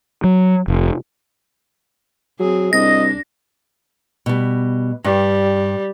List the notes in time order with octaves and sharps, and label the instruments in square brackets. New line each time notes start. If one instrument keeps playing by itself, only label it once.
[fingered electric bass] F#3
F1
[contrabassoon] F#3 [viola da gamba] C4 G#4
[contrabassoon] C2 [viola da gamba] D4 [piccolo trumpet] D#5 [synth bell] A#6
[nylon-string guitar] B2 G3
[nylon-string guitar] G2 [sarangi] G3